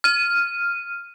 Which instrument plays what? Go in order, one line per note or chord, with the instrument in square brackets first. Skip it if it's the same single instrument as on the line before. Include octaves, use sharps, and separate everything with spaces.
[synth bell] F6 D#7